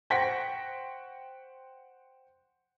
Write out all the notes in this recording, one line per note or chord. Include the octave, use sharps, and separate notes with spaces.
C5 F#5 G5 C#6 A#6 B6